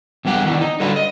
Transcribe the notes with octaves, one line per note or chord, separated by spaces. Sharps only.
E2 G2 B3 G4 F#5
D#3 E3 B3 D4 E4
D#4
D3 G3 D4 F4 F#4 B4
D#5